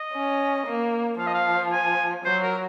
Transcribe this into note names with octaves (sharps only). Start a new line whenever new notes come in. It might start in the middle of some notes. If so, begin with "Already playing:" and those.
Already playing: D#5
C#4
A#3
F3 F5
D#5
F5
G#5
F#3 C5
A#4